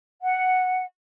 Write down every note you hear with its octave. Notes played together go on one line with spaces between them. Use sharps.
F#5